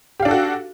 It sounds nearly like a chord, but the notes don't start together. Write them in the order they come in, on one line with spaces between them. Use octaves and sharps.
G4 F5 D4 A4 F#4